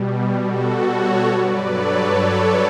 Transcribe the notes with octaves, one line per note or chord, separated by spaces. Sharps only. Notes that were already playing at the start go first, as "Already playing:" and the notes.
Already playing: B2 G3
F#4 A4
A4 C#5
G2 F#3 B4 D5
A4 C#5
A4 C#5